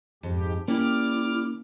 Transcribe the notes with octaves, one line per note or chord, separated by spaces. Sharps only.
F2 G#2 G4
A#3 C#4 E4 G4 D5 D6 F6